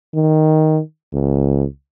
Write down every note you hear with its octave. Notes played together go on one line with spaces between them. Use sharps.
D#3
C#2